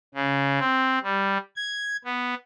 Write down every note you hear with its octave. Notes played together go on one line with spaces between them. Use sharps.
C#3
C4
G3
G#6
B3